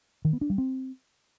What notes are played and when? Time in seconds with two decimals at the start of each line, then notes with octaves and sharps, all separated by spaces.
0.25 D#3
0.33 B3
0.41 D4
0.50 G3
0.58 C4